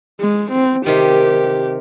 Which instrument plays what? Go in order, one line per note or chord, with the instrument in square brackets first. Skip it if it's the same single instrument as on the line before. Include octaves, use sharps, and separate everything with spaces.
[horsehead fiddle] G#3
C4
[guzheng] C3 D#3 [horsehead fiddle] G4